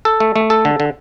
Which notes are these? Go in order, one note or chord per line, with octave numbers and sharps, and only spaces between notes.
A4
A3
A3
A4
D3
D3